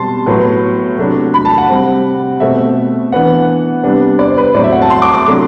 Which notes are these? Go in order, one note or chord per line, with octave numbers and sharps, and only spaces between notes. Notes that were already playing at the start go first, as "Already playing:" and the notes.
Already playing: B2 G3 C4 A5 C6
A2 F#3 B3
C3 F#3 A3 D4
B5
A5
F#5
C3 G3 C4
B2 A3 C4 E5
E3 B3 D4 F#5
C3 G3 B3 D4
D5
C5
B4
A2 F#3 C4 D5
E5
F#5
A5
C6
D6
D6
C3 F#3 A3 D4 C6